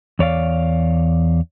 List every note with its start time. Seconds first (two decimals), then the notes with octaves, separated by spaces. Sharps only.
0.19 E2 C#5 D5 F5